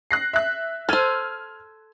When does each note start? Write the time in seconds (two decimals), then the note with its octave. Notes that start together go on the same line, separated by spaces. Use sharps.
0.11 F#6 A#6 C7
0.33 E5 F#6
0.89 A4 C5 F6 G#6 D#7